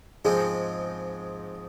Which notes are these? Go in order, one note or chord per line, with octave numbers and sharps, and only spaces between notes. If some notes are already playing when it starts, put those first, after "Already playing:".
G#2 F3 G#3 C4 D#4 G#4